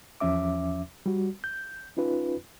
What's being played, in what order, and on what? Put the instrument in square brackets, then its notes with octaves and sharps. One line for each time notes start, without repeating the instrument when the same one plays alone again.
[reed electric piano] E2 F3 C#4 E5 D6
G3 F#4
G6
C#4 D#4 F4 B4